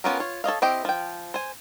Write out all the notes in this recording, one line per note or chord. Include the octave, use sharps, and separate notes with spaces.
B3 C#4 F4 G4 A#4
F4 C#5
A4 C#5 D#5 F5
C4 E4 G4 D#5 G5
F3 G5
C5 G#5